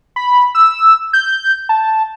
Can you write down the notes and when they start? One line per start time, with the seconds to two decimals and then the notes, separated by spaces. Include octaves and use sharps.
0.16 B5
0.55 E6
1.13 G6
1.69 A5